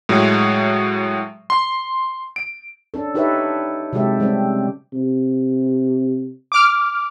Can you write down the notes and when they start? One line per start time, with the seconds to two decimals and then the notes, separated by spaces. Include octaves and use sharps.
0.09 A2 F#3 G#3
1.50 C6
2.36 D7
2.94 C#4 D4 A4
3.15 D#4 G4 A4 B4 C#5 E5
3.93 C3 F#3 G#3 G4 A4 E5
4.20 C#3 G3 G#3 C4 C#4
4.94 C3
6.52 D6 F6